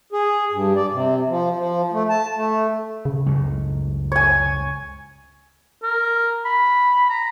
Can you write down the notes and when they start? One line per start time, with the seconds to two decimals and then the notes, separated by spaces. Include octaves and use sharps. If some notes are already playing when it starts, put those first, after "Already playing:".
0.12 G#4
0.52 G2
0.75 D5
0.92 C3
1.29 F3
1.56 F3
1.92 A3
2.09 A5
2.36 A3
3.05 C#3
3.26 C#2 F#2 A2
4.12 C#5 G#5
5.82 A#4
6.45 B5
7.09 A#5